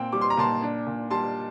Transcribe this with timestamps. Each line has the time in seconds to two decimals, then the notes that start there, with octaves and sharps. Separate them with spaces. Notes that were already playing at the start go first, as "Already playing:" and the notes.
Already playing: A#2 C4 G5
0.12 G3 D6
0.21 C6
0.30 A#5
0.37 A#2 A5 C6
0.63 D4
0.87 A#2
1.10 G3 A5 C6